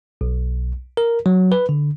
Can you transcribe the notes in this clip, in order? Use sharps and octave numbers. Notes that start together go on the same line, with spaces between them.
B1
A#4
F#3
B4
D3